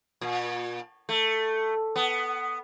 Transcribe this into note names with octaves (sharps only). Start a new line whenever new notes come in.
A#2
A3
B3